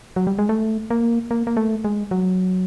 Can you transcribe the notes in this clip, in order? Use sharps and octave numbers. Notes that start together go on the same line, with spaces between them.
F#3
G3
G#3
A3
A#3
A#3
A#3
A3
G#3
F#3